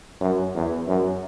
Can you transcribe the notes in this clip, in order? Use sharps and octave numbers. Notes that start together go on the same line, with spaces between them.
F#2
E2
F#2